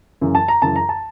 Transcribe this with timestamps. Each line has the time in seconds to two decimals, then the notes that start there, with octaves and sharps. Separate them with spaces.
0.21 F#2 C#3 E3
0.35 A5
0.48 A#5
0.62 F#2 C#3 E3 A5
0.76 A#5
0.89 A5